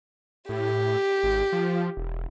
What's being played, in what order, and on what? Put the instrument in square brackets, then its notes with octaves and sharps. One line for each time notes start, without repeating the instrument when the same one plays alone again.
[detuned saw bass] A2 [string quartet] G4
[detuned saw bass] G#1
F3
E1